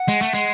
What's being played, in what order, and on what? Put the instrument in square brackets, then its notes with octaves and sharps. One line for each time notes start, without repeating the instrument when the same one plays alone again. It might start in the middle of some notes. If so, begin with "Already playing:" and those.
Already playing: [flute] F#5
[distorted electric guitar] G#3
A3
G#3